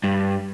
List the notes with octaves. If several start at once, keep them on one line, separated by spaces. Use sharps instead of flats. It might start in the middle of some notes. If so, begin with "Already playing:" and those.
G2